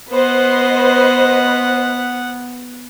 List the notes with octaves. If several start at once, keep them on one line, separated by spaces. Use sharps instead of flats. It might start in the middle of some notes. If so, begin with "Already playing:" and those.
B3 B4 C5 D#5 F#5